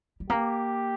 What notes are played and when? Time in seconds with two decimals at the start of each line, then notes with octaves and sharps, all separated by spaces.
0.20 G3
0.29 A#3 G4